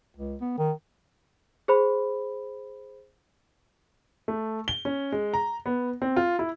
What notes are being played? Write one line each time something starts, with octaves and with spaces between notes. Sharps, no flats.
C#2
B3
D#3
G#4 C5 B5
A3
G7
C#4
G#3
A#5
B3
C4
F4
E4